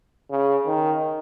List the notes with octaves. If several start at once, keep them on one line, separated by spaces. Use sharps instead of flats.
C#3
D#3